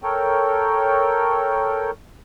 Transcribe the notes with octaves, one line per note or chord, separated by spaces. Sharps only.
A4 A#4 C#5 G5